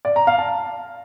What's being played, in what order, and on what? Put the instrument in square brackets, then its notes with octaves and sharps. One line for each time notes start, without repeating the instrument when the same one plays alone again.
[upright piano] D5
A#5
F5
A5